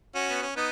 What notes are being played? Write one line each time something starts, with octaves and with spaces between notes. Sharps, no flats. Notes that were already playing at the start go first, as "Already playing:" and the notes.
C#4 F#4
B3
C#4
B3 D#4